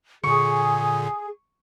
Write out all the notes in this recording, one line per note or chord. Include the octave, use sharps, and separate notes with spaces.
A#2 D3 G#4 C#6